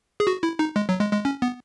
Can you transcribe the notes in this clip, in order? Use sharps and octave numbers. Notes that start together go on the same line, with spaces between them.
G#4
F#4
E4
D#4
G#3
F#3
G#3
G#3
C#4
B3